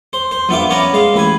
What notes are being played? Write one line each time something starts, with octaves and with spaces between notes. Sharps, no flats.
C5
C5
A#1 B3 F4 E5 D6
B3 C#4 D5 G#5 A#5
G#3 F5
A1 B4 G#5